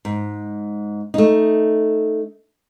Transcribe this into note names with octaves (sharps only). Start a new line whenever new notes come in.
G#2
A3 D#4